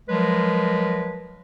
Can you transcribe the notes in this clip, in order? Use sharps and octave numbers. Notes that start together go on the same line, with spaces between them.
F3 F#3 G#3 A#4 B4